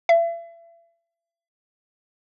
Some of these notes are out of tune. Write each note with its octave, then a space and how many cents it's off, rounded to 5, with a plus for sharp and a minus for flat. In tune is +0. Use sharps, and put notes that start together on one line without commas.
E5 +40